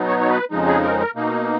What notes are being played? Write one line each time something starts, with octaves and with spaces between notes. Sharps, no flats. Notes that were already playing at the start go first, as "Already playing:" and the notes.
Already playing: B2 F#3 B3 D#4
C#5
C#5
B4
F2 C#3 F3 G#3 D#4
G#4
A#4
A#4
B2 A#3 D#4